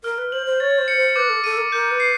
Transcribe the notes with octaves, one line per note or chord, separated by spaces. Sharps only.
A#4 F6
B4
C5 F#7
C5
C#5 A6
C5
C#7
C5
B4 D6
A4
A4 D#7
A#4
A#4 G6
B4
C7